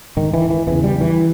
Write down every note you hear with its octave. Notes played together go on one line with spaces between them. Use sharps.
G#2 D#3
E3
E3
E2 C#3 E3
G3
E3